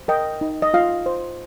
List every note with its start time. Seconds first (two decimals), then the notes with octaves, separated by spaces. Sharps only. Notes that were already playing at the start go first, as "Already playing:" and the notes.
Already playing: C5
0.08 A#4 D#5 G5
0.41 D#4
0.62 D#5
0.74 F4 F5
1.06 C5